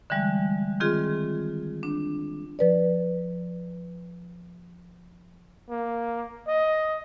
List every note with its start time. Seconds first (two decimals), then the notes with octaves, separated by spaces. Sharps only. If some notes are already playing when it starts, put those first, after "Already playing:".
0.10 D3 E3 G3 G#3
0.80 D#3 C4 F4 G#4
1.83 D4
2.59 F3 B4 D5
5.70 A#3
6.47 D#5